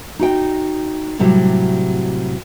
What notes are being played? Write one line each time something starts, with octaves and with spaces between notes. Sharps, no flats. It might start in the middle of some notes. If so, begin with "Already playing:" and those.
D#4 F#4 G5
A2 C3 F#3 G3